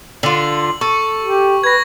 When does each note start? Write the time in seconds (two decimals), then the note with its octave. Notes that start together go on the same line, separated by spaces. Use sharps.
0.23 D3 F4 F#7
0.81 A4 C#6
1.22 G4
1.64 B4 G#6 A#6